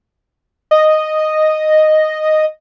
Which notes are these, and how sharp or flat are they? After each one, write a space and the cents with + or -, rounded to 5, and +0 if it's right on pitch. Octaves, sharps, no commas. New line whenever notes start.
D#5 -5